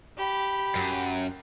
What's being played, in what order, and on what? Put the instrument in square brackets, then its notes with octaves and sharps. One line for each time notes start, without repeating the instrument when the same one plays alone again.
[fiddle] G4 B5
[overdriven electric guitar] F#2